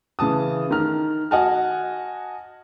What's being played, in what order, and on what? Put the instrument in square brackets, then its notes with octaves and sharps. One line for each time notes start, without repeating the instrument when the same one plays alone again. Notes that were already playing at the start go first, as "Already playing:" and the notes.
[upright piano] C#3 E3 A5 D#6
D#3 A#5 F6
F#4 D#5 F#5 G#5 A5 F6